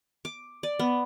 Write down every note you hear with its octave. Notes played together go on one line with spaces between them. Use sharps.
D6
D5
B3